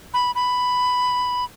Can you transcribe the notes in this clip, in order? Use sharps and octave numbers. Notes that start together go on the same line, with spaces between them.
B5
B5